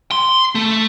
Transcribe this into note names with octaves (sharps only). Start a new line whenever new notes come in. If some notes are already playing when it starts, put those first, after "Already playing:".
C6
A3